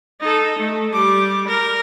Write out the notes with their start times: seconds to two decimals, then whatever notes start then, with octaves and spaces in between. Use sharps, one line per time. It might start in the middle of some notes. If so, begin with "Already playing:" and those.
0.21 D#4 A4
0.59 A3
0.93 G3 D6
1.48 A#4